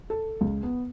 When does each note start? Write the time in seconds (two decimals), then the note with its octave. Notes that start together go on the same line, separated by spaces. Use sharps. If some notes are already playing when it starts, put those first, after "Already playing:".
0.10 A4
0.41 C#2
0.63 B3